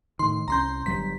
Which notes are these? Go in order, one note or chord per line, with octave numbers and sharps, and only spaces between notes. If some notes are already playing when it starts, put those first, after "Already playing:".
A2 D#3 C6
C2 E3 C#4 A#5 C6 G6
G1 F#3 G3 B6